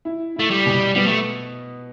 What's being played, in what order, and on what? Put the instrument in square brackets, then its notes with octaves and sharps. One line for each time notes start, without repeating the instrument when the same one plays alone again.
[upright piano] E4
[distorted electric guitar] A3 [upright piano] E4
[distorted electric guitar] G3
[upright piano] B2
[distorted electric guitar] G3 [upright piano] B3
[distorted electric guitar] A3